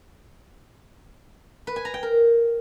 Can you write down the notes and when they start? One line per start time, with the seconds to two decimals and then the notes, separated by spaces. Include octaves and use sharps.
1.67 B4
1.76 G#5
1.85 A#5
1.94 G5
2.03 A#4